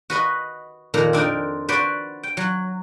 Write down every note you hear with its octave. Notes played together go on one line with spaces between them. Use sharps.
F#4 B4 D#5
F2 A#2 D#3 A#5
C4 D4 D#4 A#4
F#4 B4 C5 D5 C6
G5
F#3